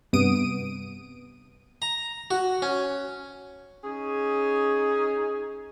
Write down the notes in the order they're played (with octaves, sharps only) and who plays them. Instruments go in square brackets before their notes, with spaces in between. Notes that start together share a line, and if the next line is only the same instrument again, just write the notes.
[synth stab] G2 C3 B3 D#6 D7 D#7
[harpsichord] A#5
F#4
C#4
[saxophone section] C#4 D#4 G#4